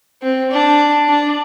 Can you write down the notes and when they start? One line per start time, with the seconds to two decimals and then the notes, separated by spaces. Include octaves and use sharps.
0.22 C4
0.50 D4
1.08 D4